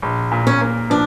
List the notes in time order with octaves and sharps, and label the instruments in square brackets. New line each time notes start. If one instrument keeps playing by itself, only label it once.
[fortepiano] A#1
A#2
[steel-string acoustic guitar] C#4
[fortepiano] A#3
[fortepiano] F3 [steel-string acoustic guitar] D4